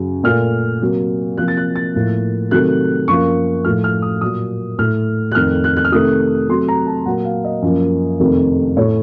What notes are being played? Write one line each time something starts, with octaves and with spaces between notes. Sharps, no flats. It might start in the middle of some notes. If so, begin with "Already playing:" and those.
Already playing: F#2 C#3 F#3
A#2 A3 F6
C3 F#3 A#3
C3 F3 A#3 F#6
A6
F#6
A6
A2 F3 A#3
C3 D#3 F#3 A3 F#6
F#2 F3 A#3 C#6
A2 F3 A3 F6
F6
D#6
A#2 F#3 A#3 D#6
A2 A3 F6
F#6
F2 D#3 A3 F6
F#6
F#6
F6
C3 D#3 A3 D#6
C3 F#3 A3 C6
A#5
A5
A#2 F#3 A#3 F#5
F5
D#5
F#2 F3 A#3
F2 C3 D#3 A3
A2 A3 C#5